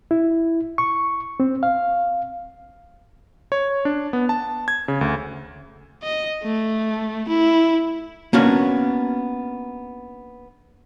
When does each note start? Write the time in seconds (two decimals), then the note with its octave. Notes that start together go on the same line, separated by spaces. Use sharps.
0.11 E4
0.78 C#6
1.40 C4
1.63 F5
3.52 C#5
3.85 D4
4.13 B3
4.29 A5
4.68 G#6
4.88 C#3
5.01 D2
6.03 D#5
6.43 A3
7.28 E4
8.33 A#3 B3 C#4 D4 F#4 C#5